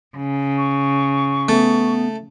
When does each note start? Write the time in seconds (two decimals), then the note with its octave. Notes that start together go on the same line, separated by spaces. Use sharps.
0.17 C#3
0.58 C#6
1.49 A3 B3